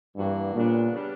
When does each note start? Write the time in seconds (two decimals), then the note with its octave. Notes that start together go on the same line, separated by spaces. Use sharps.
0.16 G2 E3 A#3 D4 F#4
0.54 A#2 C#3 G3 B3 D4
0.92 C#3 G3 B3 D4